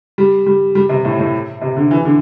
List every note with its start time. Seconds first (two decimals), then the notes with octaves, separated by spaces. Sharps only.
0.18 G3
0.46 G3
0.75 G3
0.89 C3
1.05 A2
1.19 A2
1.62 C3
1.77 D3
1.91 E3
2.05 D3